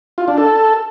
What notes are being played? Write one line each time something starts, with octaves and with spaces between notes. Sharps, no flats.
F4
D4
A4